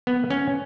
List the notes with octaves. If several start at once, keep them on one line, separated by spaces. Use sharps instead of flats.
B3
C#4